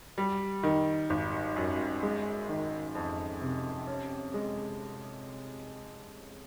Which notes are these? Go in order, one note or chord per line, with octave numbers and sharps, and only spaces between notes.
G3
D#3
G#1
F#2
G#3
D#3
F2
C3
C#4
G#3